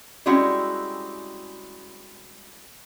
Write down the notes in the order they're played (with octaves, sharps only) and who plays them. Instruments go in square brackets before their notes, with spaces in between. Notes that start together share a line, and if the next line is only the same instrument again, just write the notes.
[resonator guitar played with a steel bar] G3 G#3 C4 C#4 E4 F#4